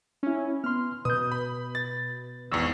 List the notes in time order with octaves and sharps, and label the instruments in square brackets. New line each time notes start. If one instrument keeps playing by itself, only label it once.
[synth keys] C#4 E4
[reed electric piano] B3 C6 [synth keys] F6
[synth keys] B2 [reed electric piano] B4 G6 [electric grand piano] D#6
[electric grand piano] B5
A6
[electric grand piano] G#1 E2 [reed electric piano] C#6 E6